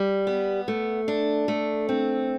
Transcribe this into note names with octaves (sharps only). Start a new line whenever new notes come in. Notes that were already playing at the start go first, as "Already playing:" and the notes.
Already playing: G3
B3
A3
D4
A3
C4